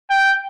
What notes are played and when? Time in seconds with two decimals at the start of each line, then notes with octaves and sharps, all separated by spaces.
0.11 G5